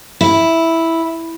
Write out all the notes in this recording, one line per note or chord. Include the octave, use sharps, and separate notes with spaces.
E4